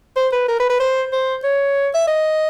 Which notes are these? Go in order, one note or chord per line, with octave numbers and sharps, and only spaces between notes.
C5
B4
A#4
B4
B4
C5
C5
C#5
E5
D#5